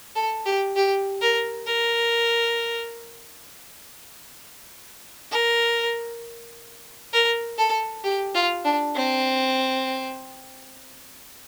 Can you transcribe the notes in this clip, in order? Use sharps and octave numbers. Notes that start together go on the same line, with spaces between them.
A4
G4
G4
A#4
A#4
A#4
A#4
A4
G4
F4
D4
C4